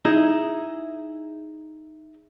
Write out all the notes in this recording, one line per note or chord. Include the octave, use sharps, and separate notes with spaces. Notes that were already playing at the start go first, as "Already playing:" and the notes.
D#4 E4 G#4 D#5